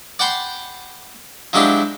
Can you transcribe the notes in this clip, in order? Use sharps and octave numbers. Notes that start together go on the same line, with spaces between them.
D5 F#5 G5 A5 B5 C6
F3 F#3 G#3 D4 E4 G4